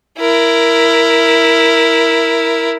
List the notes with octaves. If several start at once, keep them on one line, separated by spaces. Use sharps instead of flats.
E4 A#4